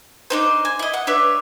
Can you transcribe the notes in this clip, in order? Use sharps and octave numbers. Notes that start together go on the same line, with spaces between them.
D4 D#4 C5
G#5
E4 D#5
F#5
D4 B4 C#5 E5